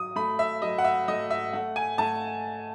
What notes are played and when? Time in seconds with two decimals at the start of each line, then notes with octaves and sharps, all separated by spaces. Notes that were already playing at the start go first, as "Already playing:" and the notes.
Already playing: F#3 D#6
0.16 A3 B5
0.39 E5
0.62 F#3 D#5
0.78 F#5
0.84 E5
1.08 A3 D#5
1.30 E5
1.53 A3 F#5
1.76 G#5
1.98 A3 A5